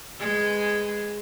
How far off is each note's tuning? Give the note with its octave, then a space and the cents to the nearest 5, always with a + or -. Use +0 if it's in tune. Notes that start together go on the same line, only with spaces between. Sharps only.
G#3 -5 G#4 +0 B4 +15